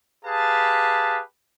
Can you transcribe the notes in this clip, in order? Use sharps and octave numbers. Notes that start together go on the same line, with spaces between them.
G4 G#4 B4 F5 A5